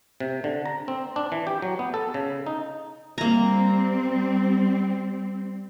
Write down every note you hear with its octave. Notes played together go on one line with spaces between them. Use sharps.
C3
D3
A#5
C4
D4
E3
G4
F#3
B3
A4
C#3
D#4
G3 A#3 C4 A#5